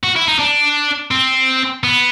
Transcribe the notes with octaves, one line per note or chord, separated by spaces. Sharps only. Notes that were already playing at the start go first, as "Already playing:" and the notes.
F#4
E4
D#4
D4
C4
B3